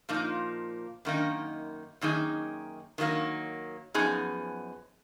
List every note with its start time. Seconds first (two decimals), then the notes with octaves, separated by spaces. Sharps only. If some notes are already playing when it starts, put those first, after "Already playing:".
0.09 A#2 F3 A#3 D#4
1.05 F#2 D#3 A#3 D#4
2.01 F#2 D#3 A#3 D#4 G#4
2.98 D#3 F#3 A#3 D#4
3.94 F#2 F3 B3 D#4 G#4